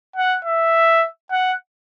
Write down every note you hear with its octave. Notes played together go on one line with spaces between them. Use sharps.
F#5
E5
F#5